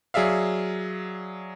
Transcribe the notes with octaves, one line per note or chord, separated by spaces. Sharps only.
F#3 G#4 D5 E5 F5